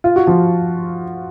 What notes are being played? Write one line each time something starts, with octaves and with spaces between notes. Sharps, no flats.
F4
F#4
F3 F4